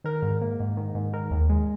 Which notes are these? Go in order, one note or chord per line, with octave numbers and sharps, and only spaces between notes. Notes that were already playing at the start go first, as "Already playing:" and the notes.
D#3 A#4
G#2
A#3
G#2
D#3
G#2
D#3 A#4
D#2
G#3